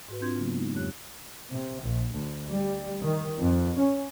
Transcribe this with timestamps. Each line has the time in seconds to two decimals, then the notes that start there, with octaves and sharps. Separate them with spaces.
0.09 G#2 F#4 B4
0.21 C4 D4 F4 C6 G6 G#6
0.38 C#3 F#3 A#3 B3
0.54 G#3 B3 D#4
0.74 F2 F#3 G4 C#5 F#6
1.50 C3
1.81 A#1
2.12 D2
2.49 G3
3.02 D#3
3.40 F2
3.77 C#4